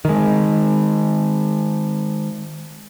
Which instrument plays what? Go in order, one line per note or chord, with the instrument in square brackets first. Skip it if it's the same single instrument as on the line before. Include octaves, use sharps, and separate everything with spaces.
[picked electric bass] D#3 G#3